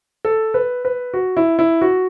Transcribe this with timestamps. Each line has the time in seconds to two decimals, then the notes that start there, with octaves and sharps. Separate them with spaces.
0.25 A4
0.54 B4
0.85 B4
1.14 F#4
1.37 E4
1.59 E4
1.81 F#4